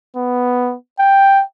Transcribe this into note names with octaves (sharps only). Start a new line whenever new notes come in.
B3
G5